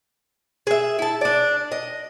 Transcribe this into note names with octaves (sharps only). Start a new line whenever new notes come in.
G#4 E5
E4 A5
D4 D5
D#5